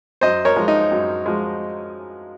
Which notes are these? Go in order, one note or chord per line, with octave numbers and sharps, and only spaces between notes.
F#2 C5 D#5
A#4 C#5
F3 G#3
D#4
F#2
F3 G#3